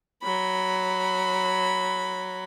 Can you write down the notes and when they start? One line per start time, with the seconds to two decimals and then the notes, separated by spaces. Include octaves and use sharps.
0.23 F#3 B5